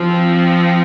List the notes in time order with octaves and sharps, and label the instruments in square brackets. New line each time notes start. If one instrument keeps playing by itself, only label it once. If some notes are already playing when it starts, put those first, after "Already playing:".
Already playing: [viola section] F3 C4